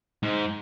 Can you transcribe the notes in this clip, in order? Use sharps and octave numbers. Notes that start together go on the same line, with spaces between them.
G#2